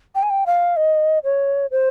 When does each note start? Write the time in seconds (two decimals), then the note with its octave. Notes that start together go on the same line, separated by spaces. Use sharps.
0.15 G5
0.23 G#5
0.30 G5
0.46 F5
0.76 D#5
1.24 C#5
1.71 C5